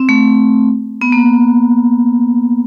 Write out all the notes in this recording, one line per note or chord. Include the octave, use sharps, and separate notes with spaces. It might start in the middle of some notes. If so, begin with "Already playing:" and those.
Already playing: C4
A3
B3
A#3